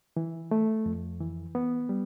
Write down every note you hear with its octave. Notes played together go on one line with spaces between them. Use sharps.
E3
A3
F2
E3
B3
G3